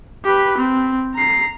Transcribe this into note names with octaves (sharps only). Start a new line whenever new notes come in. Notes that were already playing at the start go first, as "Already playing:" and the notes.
G4 B4
C4
A#5 C7